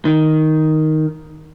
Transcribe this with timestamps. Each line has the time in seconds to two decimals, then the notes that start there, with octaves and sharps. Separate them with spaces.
0.05 D#3